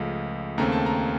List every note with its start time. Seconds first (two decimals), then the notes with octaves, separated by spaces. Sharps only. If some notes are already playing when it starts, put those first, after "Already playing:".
Already playing: C#2 C#3 F3 A3
0.58 D#2 C#3 A3 C4 A#5
0.72 A5
0.86 A#5